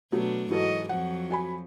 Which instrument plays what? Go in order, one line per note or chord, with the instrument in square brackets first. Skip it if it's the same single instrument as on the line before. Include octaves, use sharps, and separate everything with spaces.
[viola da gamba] B2 B3 D4 [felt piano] F#3 A3
[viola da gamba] G#2 F#4 D#5 [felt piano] E3 F#3 A4
[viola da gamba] F2 F3 F#3 [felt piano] F#5
[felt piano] F#4 G#5 B5